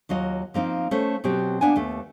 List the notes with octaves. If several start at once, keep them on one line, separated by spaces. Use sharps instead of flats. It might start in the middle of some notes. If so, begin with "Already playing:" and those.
D#2 F#3 F4 D#5
F3 A#3 C4 D#4
A3 C#4 C5
B2 F#3 C4 G4
A#3 B3 D4 F#5 G#5
D#2 A3 B3